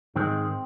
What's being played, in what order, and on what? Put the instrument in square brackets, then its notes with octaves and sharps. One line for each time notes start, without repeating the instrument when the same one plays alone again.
[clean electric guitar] G#2 D#3 G#3 C4